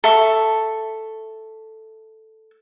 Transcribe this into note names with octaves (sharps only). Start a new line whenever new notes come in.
A4 E5 C#6